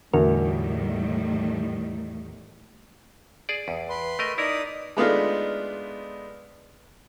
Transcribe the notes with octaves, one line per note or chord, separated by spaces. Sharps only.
E2 A2 D3 D#3 G3 F#4 A#4
G#4 D5
E2
B4 C6
A3 A#4 D#5
D#4 E4 A#4 D5 D#6
G#3 A3 B3 D4 D#4 F4